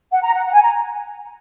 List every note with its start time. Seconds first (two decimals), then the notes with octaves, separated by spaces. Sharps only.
0.12 F#5
0.23 A#5
0.34 F#5
0.46 F#5
0.53 G#5
0.62 A#5